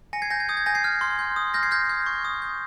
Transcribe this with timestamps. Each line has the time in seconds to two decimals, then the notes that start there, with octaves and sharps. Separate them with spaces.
0.13 G#5 A#6 C#7
0.22 G#6 C7
0.30 G#5 G6 A#6
0.40 G#6
0.49 D#6 G6
0.57 G#6
0.66 G#5 G6 A#6
0.75 G#6 C7
0.84 F6
1.01 C6
1.19 G6
1.36 D#6
1.54 F6 G6 A#6
1.63 G#6 C7
1.71 F6 G6 A#6
1.89 G6
2.06 C#6
2.25 D#6
2.42 G6